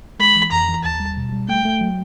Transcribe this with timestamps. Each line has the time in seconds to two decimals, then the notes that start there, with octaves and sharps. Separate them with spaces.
0.19 G#3 B5
0.36 E3
0.52 F2 A#5
0.69 E3
0.84 D#2 A5
1.00 G3
1.17 B2
1.33 G3
1.49 A3 G5
1.65 A3
1.81 F#3